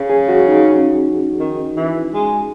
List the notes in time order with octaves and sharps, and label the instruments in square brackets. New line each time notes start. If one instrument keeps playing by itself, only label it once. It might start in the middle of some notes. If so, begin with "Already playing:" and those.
Already playing: [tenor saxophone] C#3
[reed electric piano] G#4
F#4
D#4
C#4
[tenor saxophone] D#3
E3
G#3